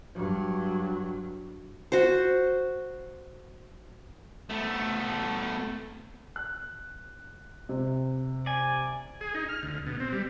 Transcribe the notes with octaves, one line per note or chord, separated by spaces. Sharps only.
G2 F#3
F#4 C5
A3 B3
F#6
C3
D5 G#5
G#4
D#4
F6
D2
B2
C4
G3